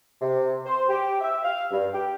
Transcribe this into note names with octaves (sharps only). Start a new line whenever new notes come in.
C3
C5
G4
E5
F5
G2
G4